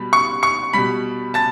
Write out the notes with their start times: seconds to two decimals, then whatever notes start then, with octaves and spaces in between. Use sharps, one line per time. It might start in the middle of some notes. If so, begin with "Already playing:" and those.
Already playing: B2 G3 B5
0.13 C#6 C#7
0.43 C#6 C#7
0.73 B2 G3 B5 B6
1.34 A5 A6